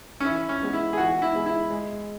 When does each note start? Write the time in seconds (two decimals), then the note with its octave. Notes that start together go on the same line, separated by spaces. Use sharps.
0.20 C#4
0.25 E3 E4
0.49 C#4
0.62 G#3 B3 G#4
0.73 E4
0.93 G#4
0.97 E3 F#4
1.22 E4
1.34 G#3 B3 G#4
1.46 E4
1.70 G#3